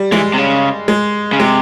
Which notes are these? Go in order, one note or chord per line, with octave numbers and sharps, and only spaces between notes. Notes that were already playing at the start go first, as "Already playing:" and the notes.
Already playing: G3
E3 G#3
C3
C#3
G#3
C#3
C3 G#3